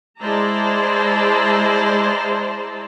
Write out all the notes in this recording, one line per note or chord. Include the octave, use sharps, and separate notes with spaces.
G#3 E4 C5 D5 A5 A#5